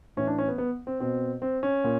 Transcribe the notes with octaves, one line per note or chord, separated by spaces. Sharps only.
A2 E3 C#4
D4
C#4
B3
B3
C4
B2 C4
C4
C#4
A#2